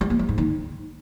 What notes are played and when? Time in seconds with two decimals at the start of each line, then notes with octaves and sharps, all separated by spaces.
0.01 G3
0.10 A#3
0.19 G3
0.29 G#2
0.38 D#3